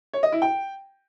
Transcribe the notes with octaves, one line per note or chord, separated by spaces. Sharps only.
C#5
D#5
E4
G5